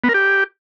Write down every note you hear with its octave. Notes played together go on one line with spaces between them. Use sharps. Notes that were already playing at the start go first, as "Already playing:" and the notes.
B3
A#4
G4